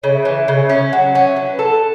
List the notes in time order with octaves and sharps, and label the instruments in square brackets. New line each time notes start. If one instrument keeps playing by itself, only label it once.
[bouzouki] C#3 [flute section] C#5
[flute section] E5
C#5
[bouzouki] E3
[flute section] E5
[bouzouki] C#3
[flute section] C#5
E5
[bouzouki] C#4
[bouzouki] F#3 [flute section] F#5
[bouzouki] C#4 [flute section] F#5
[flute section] E5
[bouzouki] F#3
[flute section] B4
[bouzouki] A4